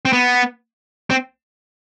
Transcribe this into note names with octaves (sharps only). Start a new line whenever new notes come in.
C4
B3
C4